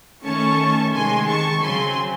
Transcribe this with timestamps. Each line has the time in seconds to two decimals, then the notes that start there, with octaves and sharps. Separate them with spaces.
0.24 D#3 A3 C#4 A5 C#6
0.93 C3 D#3 G#3 G#5 C6
1.28 A5 C#6
1.62 C#3 F#3 C4 G#5 C6